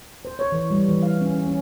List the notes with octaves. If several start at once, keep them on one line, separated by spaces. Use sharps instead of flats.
C5
C#5
E3
G3
E3
F5
C#4
C#4
C#4